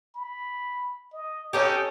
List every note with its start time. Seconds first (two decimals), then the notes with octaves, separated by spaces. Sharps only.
0.15 B5
1.13 D#5
1.53 C#4 D#4 G4 A4